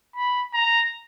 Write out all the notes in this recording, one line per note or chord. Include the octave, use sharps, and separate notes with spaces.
B5
A#5